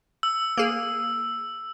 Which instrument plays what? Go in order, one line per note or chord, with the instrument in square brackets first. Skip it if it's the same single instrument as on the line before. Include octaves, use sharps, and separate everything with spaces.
[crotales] E6
[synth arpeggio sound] A#3 G#4